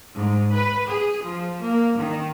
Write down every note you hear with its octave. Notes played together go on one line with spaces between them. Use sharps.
G#2
B4
G#4
F3
A#3
D#3